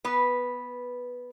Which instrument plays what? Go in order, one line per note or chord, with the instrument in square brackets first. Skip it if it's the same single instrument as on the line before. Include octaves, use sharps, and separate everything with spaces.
[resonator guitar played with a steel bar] B3 B4